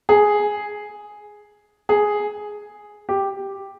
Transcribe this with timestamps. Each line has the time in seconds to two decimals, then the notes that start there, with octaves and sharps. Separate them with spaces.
0.09 G#4
1.89 G#4
3.09 G4